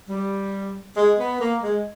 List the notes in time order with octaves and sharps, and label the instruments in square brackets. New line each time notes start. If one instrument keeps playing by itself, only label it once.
[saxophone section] G3
G#3
B3
A#3
G#3